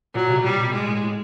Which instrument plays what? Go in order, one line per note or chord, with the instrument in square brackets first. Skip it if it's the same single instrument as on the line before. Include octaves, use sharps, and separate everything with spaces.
[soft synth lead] A#2 [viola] F#3
[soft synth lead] C3
[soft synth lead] A#2 [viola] G3
[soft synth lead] B2
[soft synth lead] A2 [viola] G#3
[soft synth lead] A2
A2